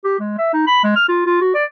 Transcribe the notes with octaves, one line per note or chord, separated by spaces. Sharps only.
G4
G#3
E5
D#4
B5
G#3
F6
F4
F4
F#4
D5